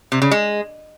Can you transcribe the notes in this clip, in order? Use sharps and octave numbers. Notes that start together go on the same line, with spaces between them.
C3
C#3
G#3